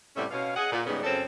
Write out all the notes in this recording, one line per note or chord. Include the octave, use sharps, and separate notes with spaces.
A2 C3 G3 B3 C#4 E5
B2 C#4 F5
G#4 D#5 F#5
A#2
G#2 C#3 G3 G#3 B3
F#2 C#3 C4 C#4 A4